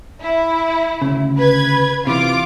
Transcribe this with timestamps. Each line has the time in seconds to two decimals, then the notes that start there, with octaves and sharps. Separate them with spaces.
0.21 E4
1.02 D2 C#3
1.38 B4 G#6
2.07 C3 E3 F4 D6 D7